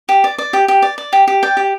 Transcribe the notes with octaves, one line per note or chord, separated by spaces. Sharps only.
G4
D5
D5
G4
G4
D5
D5
G4
G4
D5 G5
G4